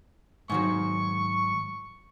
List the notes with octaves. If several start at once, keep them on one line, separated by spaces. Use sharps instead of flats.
G#2 D#3 F#3 C#6